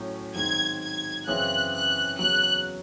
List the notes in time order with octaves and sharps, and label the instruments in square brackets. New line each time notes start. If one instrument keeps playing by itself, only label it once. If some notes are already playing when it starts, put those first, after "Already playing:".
Already playing: [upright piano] A2 F#3 C#4
[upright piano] G#2 D#3 F#3 C4 [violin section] G#6
[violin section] G#6
[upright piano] F#2 C#3 E3 C4 E4 [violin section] F#6
[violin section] F#6
[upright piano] E2 C#3 F#3 [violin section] F#6